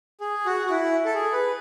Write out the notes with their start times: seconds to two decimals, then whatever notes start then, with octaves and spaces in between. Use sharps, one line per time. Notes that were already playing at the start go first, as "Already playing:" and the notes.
0.21 G#4
0.46 F#4
0.66 F#4
0.70 E4
1.05 A4
1.14 G#4
1.33 B4